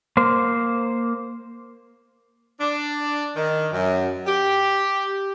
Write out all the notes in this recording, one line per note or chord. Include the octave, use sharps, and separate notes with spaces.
A#3 C5
D4
D#3
F#2
G4